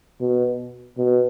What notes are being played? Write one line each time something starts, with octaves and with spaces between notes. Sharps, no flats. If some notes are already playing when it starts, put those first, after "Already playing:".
B2
B2